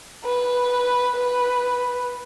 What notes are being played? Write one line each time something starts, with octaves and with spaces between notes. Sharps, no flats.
B4
B4